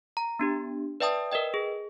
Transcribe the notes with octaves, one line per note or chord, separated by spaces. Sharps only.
A#5
B3 D4 G4
B4 D5 E5 G5 A5 D#6
A#4 B4 D#5 G5
G#4